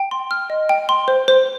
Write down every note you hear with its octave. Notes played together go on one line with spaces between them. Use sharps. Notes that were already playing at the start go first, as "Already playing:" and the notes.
Already playing: G5
C6
F6
D#5
G5
C6
C5
C5